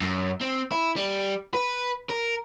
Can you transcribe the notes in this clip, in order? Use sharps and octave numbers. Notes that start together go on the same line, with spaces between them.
F#2
C4
E4
G3
B4
A#4